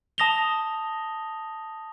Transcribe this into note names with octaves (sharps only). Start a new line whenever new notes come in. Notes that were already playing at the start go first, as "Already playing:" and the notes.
A5 D#6 A#6 F7 G7